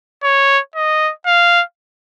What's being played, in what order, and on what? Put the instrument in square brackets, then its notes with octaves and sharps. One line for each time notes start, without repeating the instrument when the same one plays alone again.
[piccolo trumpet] C#5
D#5
F5